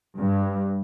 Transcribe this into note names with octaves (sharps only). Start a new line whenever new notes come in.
G2